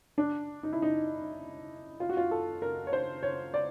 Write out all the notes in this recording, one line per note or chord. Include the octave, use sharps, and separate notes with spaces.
D4
D#4
E4
D#4
F4
F#4
F4
A4
A#4
C#5
C5
C#5
D5